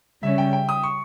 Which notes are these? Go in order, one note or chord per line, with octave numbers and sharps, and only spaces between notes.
C#3 G3 C#4 E5
G5
G5
D#6
C#6